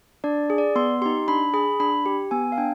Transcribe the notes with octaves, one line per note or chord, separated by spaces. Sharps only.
D4 D5
G#4
D5
B3 C6
D#4 G4 C6
D4 B5
G#4 B5
D4 B5
G4
B3 G#5
F5
D4 G5